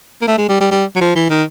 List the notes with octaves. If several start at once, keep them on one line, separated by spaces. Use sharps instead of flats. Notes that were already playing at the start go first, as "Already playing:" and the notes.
A#3
A3
G#3
G3
G3
G3
F#3
F3
E3
D#3